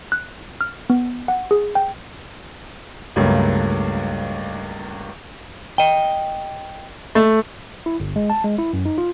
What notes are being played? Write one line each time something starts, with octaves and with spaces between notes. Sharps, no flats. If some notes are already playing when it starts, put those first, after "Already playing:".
F#6
F6
B3
F#5
G#4
G5
C#2 G2 F#3 A3 A#3
D#5 G5
A3
E4
G1
G#3
A5
G#3
E4
F#2
D#4
F4